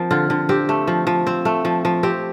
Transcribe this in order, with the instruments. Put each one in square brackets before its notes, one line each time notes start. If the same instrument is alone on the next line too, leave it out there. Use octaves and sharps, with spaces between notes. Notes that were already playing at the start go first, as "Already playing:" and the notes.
Already playing: [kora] F3 C4 A#4
D3 F4
D3
C4 G4
A3
F3
F3
C4
A3
F3
F3
C4 G4